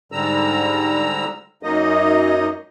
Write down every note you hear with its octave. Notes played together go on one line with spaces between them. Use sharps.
G#2 D3 G3 A#5 E6
F#2 F#3 A#3 D#4 D#5